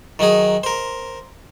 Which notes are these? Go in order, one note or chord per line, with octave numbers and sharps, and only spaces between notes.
D#3 F#3 D#4 G#4
A#4 C5